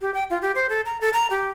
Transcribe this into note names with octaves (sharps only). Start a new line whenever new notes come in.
G4
G5
F4
G4
C5
A4
A#5
A4
A#5
G4